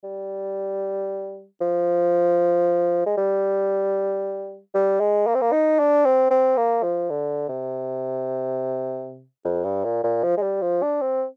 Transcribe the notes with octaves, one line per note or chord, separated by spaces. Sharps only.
G3
F3
G#3
G3
G3
G#3
A#3
C4
A#3
D#4
D4
C4
C4
A#3
F3
D3
C3
F2
G2
A#2
A#2
F3
G#3
G3
F3
D4
C4